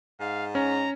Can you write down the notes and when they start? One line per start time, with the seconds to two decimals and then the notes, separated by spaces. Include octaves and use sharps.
0.20 G#2 F5
0.55 C#4 A#5